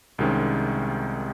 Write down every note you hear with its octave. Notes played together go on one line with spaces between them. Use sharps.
C2 C3 D#3 G#3 C#4